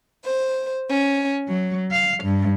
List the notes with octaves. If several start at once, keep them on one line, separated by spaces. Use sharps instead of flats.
C5
C#4
F#3
F5
G2